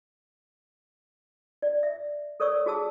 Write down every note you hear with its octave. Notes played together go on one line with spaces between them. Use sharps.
D5
E5
A4 A#4 C#5 D5 C#6 E6
F#4 G#4 A5 E6